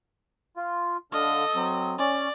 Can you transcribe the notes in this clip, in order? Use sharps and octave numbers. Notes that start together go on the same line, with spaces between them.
F4
D3 A4 D#5 F5
F#3 C4
C#4 D5